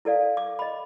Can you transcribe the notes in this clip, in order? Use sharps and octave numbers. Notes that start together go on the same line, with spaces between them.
E4 A4 D5 F5
D6
D#5 B5